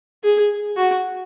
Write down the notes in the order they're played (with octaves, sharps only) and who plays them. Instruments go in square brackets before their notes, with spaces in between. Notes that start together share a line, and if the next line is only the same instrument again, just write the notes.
[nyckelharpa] G#4
F#4